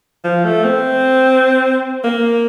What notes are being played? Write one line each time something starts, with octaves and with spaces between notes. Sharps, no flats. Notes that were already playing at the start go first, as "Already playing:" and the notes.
F3
A3
C4
A#3